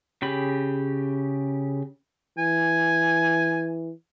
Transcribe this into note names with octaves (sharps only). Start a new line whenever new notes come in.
C#3 G4 B5
E3 G#5